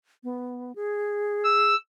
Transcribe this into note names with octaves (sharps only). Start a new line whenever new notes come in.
B3
G#4
E6